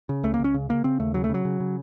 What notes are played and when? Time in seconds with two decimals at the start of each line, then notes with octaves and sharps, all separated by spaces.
0.09 C#3
0.23 C#2 A3
0.34 A#3
0.39 C#2 C#4
0.54 C#3
0.69 C#3 A#3
0.84 C#3 C4
1.00 D#2 A3
1.14 C#3 F#3
1.24 A3
1.29 C#3 F#3
1.45 C#3
1.60 C#3